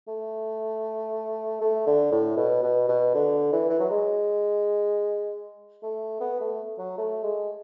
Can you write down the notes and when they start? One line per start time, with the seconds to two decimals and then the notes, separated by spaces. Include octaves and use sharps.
0.08 A3
1.61 A3
1.87 D3
2.12 A2
2.37 B2
2.63 B2
2.88 B2
3.14 D3
3.53 E3
3.70 E3
3.80 F#3
3.91 G#3
5.83 A3
6.20 B3
6.41 A3
6.79 F#3
6.98 A3
7.23 G#3